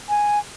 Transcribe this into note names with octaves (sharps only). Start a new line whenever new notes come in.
G#5